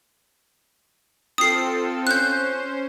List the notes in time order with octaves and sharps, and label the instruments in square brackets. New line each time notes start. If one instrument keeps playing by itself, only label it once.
[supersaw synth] C4 F4 A4 [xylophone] D#6 C7
[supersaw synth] C#4 C5 [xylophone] F#6 G6